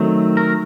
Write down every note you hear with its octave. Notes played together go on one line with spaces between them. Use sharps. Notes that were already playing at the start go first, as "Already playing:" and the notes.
Already playing: D#3 F#3 A3 C4
A#4